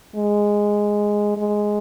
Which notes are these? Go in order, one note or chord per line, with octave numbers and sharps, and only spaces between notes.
G#3
G#3